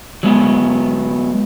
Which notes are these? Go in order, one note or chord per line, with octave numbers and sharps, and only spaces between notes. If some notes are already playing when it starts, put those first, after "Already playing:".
F#3 G#3 B3